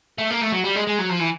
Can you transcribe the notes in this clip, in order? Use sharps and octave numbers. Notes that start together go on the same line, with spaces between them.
A3
A#3
A3
F#3
G3
G#3
G#3
F#3
F3
E3